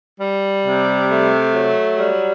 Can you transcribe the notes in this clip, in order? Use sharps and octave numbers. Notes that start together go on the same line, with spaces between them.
G3
C3
A3
F#3
G3